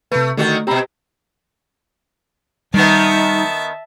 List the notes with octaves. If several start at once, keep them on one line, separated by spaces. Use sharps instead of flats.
C3 A3 B4
D3 D#3 A3 F#4
B2 C4 G4 A#5 B5
D#3 G3 B3 D#4 E5 A5